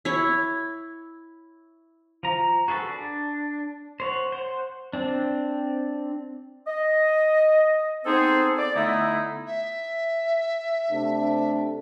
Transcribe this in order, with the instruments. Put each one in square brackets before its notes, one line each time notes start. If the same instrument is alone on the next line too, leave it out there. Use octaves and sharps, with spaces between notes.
[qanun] E4 C#5
[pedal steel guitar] F3 A#5
F#4 G#4 A4 B4
D4
C5 C#5 F#5
C5 F#5
C4 D4
[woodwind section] D#5
B3 C4 D#4 G#4 A4 C5
D5
D3 A3 B3 D#4 E4
[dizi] E5
[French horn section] C3 A3 D4